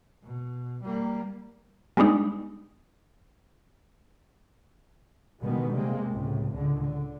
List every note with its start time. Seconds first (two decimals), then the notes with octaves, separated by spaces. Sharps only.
0.24 B2
0.84 G3 A#3
1.97 G3 G#3 B3 D4 D#4
5.42 B2 D3 D#3 G3 G#3 B3
5.73 C3 G3 G#3 A#3 C4
6.10 C#2 A2 C3
6.51 C#2 A2 D3
6.82 D3